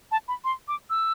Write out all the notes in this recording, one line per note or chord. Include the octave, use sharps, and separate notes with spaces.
A5
B5
C6
D6
E6